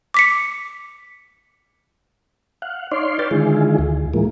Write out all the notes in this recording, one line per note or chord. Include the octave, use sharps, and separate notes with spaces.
D6 B6 C#7
F5 F#5
D#4 C#5 D5 F5 C6
B4 C#5 D5 F5 G5 A5
D3 D#3 G#3 E4 F4 G#4
D2
A2 E3 F3 G#3 A#3